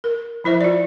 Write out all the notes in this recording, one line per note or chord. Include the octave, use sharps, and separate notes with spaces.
A#4
F3 E4 C5 E5
F4 D5